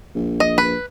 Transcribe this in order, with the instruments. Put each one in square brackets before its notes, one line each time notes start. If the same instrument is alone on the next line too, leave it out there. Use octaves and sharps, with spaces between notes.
[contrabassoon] A#1
[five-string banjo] D#5
B4